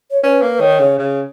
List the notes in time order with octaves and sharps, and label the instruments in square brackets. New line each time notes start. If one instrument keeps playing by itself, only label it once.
[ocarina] C#5
[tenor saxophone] C#4 [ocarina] B4
[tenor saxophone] A#3
[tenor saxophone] D#3 [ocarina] C#5
[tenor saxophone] C#3
C#3